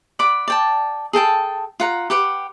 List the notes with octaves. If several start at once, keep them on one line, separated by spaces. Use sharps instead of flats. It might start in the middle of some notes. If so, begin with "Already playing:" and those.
D5 F#5 B5 D6
D5 G5 A5
G#4 A4 G5 A5
F4 F#5 A#5
G4 B4 F#5 D6